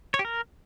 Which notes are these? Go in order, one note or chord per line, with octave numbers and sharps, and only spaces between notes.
C#5
G4
A#4